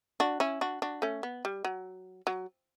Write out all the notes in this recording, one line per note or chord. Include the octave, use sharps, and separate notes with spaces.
D4 F#4
C#4 E4
D4 F#4
D4 F#4
A3 C#4
B3
G3
F#3
F#3